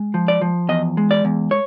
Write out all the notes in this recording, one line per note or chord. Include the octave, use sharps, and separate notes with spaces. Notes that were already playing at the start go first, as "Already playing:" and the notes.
Already playing: G#3
F3
D5
F3
E2 D#5
G#3
D5
E2
C#5